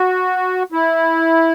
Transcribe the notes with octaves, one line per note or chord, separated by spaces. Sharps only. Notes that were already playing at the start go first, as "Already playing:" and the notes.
Already playing: F#4
E4